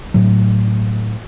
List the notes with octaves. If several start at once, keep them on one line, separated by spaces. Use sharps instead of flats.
A2 F#3